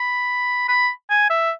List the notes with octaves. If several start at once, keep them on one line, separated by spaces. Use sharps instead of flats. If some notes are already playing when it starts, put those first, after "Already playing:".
Already playing: B5
B5
G#5
E5